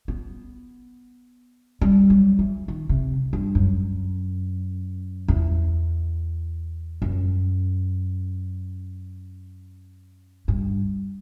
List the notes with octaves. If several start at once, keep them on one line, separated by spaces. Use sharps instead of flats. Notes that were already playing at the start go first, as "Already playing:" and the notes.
B3
G3
F#3
E3
D#3
C3
G2
F#2
E2
F#2
G2